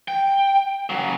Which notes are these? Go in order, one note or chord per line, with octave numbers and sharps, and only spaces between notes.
G5
C#3 F#3